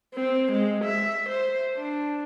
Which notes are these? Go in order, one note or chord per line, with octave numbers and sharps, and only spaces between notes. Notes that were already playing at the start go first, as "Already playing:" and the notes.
C4
G#3
E5
C5
D4